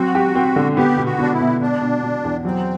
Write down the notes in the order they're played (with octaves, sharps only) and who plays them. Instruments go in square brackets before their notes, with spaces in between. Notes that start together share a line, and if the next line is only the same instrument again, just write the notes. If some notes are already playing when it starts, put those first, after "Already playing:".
Already playing: [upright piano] F#3 C4 [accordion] F#4
[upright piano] G4
C4
D3
[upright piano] B3 [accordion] G4
[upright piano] B2
[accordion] F#4
[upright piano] B3 [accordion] D4
[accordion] E4
[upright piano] B2
[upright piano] B2 [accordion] D4
[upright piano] B2
B2
E2
[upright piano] F#3 [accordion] C4